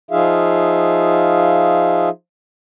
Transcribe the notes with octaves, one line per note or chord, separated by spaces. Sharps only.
F3 D#4 F4 G#4 E5 F5